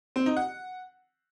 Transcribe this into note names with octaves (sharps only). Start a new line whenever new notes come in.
C4
D#4
F#5